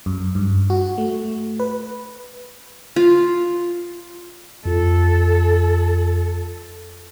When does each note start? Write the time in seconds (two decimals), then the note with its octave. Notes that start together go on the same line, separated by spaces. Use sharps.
0.06 F#2
0.35 G2
0.70 F#4
0.98 A3
1.60 B4
2.96 F4
4.66 F2 F4 A4